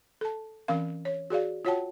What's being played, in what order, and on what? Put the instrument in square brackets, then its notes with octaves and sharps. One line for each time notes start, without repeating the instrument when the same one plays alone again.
[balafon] A4 A5
E3 C4 C#4 A#4 F5
C#5
F#4 G#4 D5 F5
F4 F#4 C#5 F#5 G5 A5